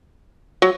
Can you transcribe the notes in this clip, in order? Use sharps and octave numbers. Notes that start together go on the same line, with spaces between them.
F#3